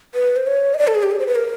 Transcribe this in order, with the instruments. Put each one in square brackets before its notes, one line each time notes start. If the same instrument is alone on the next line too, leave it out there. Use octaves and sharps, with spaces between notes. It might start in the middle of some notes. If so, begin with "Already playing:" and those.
[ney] B4
C5
C#5
D#5
D5
A4
G#4
G4
G#4
C5
B4
A#4